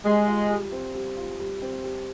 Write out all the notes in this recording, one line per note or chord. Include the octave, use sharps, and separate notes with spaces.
G3 G#3
F4
G3
C4
G3
F4
G3
C4
G3